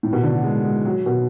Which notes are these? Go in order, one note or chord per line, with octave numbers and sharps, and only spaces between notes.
A2
B2
D3
F#3
G#3
G#3
F#3
B2